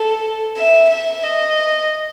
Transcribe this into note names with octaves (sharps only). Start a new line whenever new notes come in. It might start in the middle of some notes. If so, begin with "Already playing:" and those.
Already playing: A4
E5
E5
D#5